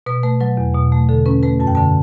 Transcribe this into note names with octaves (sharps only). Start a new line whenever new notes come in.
B2 B4
A3 B4
F#3 B4
E2
B2
A3
D3 A4
C#4 B4
A3 B4
F#2 A5
G5
D3 A5